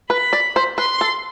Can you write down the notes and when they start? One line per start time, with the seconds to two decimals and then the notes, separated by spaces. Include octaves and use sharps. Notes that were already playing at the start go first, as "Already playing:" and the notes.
0.10 B4 B5
0.33 D5
0.56 C5
0.78 B4 C6
1.01 A4